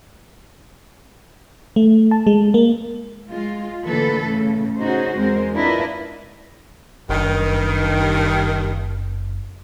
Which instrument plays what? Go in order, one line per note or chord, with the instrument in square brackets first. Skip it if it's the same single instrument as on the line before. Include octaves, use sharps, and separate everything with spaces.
[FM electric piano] A3
A5
G#3
A#3
[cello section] G#3 F4
A2 D3 E3 A#3 A4 B4
A2 C#3 A3
C#4 D#4 F#4 G#4 C5
E2 G#3 C4 A#4 C5
D4 E4 F4 A#4 B4 D#5
[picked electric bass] F#1 [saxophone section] G2 D#3